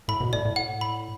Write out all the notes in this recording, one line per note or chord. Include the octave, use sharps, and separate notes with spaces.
A2 B5
B2
A2 D5
A2
F#5
B5